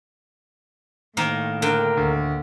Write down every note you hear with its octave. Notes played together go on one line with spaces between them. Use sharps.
A2 D#3 A#3 D#4
D3 A#4 G5
D2